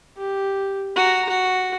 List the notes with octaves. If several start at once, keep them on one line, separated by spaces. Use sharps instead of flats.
G4
F#4 A#5
F#4